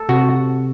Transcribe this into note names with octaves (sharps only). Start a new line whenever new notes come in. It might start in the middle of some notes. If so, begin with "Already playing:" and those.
Already playing: A4
C3 F#4